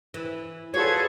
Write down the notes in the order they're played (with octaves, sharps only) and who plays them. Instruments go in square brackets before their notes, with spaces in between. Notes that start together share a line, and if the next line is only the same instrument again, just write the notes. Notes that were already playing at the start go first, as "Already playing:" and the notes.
[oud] E3
[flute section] F4 F#4 B4 [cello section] G#4 A4 [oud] C#5 [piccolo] G#6